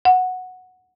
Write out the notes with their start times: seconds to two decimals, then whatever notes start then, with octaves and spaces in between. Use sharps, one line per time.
0.05 F#5